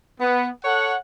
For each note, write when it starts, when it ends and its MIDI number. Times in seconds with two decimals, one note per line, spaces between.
0.21 0.49 59
0.64 0.95 69
0.64 0.95 73
0.64 0.95 78